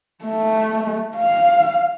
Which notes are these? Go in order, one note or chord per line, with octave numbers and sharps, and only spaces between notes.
A3
F5